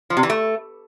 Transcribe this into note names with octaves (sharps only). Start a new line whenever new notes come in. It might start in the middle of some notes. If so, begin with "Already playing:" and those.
F3
C3
E3
A3